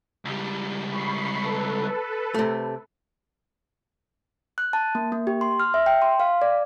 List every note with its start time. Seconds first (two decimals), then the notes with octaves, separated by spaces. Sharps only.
0.25 C#2 G3
0.90 B5 C#6 C7
1.42 A4 B4
2.34 C3 A3
4.58 F#6
4.73 A5
4.95 A#3
5.12 A#3
5.27 G4
5.41 C6
5.60 F6
5.74 E5
5.86 G5
6.02 C6
6.20 F5
6.42 D5